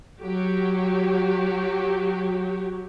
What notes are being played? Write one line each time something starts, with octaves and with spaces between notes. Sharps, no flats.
F#3 F#4 G4